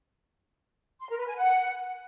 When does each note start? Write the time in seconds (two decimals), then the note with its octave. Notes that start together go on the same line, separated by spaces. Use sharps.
1.00 C6
1.09 A#4
1.18 B4
1.27 G#5
1.36 F#5